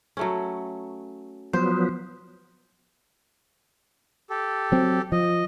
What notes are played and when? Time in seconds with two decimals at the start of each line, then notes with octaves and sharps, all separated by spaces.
0.17 F#3 A3 C#4
1.53 F3 F#3 B3 C5
4.30 G4 A4
4.72 F#3 C4
5.12 F3 D#5